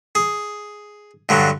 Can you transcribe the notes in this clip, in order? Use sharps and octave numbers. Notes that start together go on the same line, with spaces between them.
G#4
G2 D3 F#3